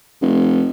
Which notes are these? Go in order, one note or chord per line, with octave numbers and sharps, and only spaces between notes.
F1